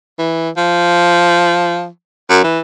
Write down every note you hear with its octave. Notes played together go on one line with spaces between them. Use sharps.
E3
F3
F#2
E3